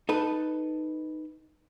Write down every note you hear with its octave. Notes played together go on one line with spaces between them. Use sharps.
D#4 A4 B4